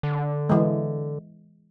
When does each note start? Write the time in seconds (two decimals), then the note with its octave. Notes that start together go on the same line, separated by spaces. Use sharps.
0.03 D3
0.49 E3 G#3